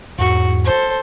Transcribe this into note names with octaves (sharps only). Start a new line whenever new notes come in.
E2 G#2 F#4
A4 C5